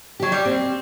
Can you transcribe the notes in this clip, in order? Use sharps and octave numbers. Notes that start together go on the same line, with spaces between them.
F#3 G4
G3
C4